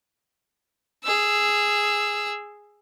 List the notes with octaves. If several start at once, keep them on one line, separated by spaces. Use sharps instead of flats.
G#4 E6